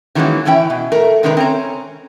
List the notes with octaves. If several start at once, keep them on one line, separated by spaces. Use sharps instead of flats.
D#3 E3 F#3 G#3 A#3 C#4
A2 E3 C#4 E4 G5
B2
A3 A#4
C3 D#3 G#3 D4 A#4 B4
C4 C#4 A#5